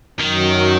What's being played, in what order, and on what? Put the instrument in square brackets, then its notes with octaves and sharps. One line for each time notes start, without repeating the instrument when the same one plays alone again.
[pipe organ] F#2 F#3 [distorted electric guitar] D#3